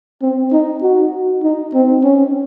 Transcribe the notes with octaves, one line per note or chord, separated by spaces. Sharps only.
C4
D#4
F#4
D#4
C4
C#4